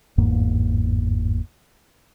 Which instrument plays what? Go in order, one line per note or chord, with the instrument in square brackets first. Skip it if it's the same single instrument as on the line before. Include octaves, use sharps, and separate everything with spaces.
[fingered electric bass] G1 E2 G#2 A#3